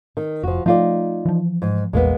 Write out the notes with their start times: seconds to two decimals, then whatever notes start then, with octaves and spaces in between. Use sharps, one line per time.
0.17 D#3
0.43 F1 F3 F#4
0.66 F3 A3 D#4 F4 D5
1.26 E3 F3
1.62 G#2
1.93 A#1 E2 G#3 A#3 B3